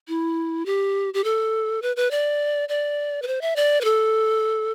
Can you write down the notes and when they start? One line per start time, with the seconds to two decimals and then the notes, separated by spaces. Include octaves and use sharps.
0.08 E4
0.66 G4
1.14 G4
1.24 A4
1.82 B4
1.96 B4
2.11 D5
2.69 D5
3.22 B4
3.27 C5
3.41 E5
3.56 D5
3.81 B4
3.84 A4